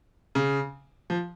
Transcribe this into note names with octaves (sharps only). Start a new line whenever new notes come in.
C#3
F3